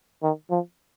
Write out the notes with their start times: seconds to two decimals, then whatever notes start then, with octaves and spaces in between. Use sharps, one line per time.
0.23 D#3
0.51 F3